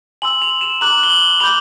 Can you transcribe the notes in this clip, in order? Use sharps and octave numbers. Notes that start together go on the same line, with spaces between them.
G#5 C6 E6 F#7
F7
E7
A#5 D6 F#6 F#7
G7
F#7
B5 D6 G6 F7